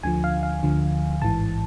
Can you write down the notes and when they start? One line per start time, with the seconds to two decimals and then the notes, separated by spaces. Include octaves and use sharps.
0.03 D2 D3 F3 G#5
0.24 F5
0.43 F5
0.63 D2 D3 F3
1.22 A1 G#2 E3 A5